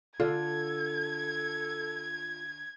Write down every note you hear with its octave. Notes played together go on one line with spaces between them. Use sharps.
D3 F4 A4 G#6